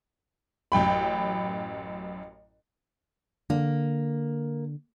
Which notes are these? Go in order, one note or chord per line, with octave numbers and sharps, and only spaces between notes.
A1 F#2 G5 B5
D3 A#3